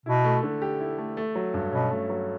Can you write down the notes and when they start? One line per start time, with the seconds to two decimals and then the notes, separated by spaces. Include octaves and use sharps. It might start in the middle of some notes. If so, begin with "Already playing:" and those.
0.06 B2 E4
0.24 A3
0.43 D3
0.62 G4
0.80 E4
0.98 A3
1.17 A3
1.35 F#3
1.54 G2
1.72 B2 C#4
1.91 A3
2.10 F#3